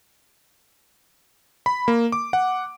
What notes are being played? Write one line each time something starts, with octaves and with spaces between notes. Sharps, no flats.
B5
A#3
D6
F#5